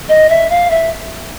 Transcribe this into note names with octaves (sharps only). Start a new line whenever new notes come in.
D#5
E5
F5
E5